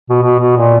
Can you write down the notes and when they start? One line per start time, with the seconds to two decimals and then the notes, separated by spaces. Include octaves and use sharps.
0.09 B2
0.22 B2
0.39 B2
0.57 A#2